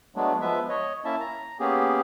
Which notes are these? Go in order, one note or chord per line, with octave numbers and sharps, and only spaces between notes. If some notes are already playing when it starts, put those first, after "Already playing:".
F#3 G#3 A3 B3 D4
F3 G#3 B3 B4 E5
C#5 D#5
A#3 C#4 E4 E5 A5
A#5
A#3 B3 C#4 G4 G#4